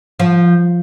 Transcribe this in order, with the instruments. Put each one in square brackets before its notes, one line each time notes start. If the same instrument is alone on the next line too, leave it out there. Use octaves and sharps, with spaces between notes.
[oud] F3